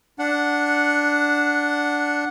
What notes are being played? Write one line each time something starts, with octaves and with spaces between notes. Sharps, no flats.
D4 F#5